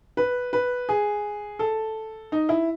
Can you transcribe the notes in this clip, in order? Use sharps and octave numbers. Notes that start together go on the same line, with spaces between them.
B4
B4
G#4
A4
D#4
E4